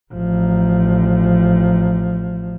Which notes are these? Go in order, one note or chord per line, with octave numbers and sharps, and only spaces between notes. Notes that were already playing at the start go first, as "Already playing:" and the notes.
A1 F3